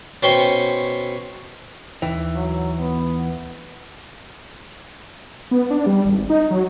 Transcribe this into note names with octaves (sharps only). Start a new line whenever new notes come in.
B2 C#4 C5 G5 C6 C#6
D#2 E3
F#3
B3
B3
D4
G3
G#1
D#4
F#3